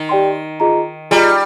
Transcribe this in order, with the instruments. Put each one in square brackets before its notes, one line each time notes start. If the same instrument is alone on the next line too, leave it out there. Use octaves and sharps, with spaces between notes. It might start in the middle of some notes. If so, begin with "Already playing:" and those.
Already playing: [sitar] D#3
[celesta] G4 D5 G5 C6
F4 G#4 D#5 A#5
[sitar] G3 [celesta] F4 G#4 D#5 A#5